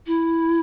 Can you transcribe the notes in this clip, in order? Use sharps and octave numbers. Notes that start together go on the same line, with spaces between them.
E4